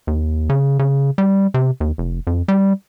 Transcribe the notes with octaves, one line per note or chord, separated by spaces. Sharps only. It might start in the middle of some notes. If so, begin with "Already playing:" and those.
D#2
C#3
C#3
G3
C3
D#2
F1
F2
G3